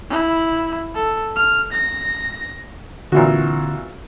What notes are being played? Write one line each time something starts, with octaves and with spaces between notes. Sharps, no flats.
E4
A4
F6
A#6
A#2 D3 E3 C4 F#4